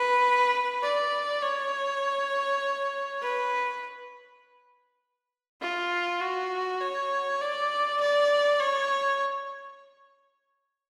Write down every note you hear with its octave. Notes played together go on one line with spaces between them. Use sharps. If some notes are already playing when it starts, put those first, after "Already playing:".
Already playing: B4
D5
C#5
B4
F4
F#4
C#5
D5
D5
C#5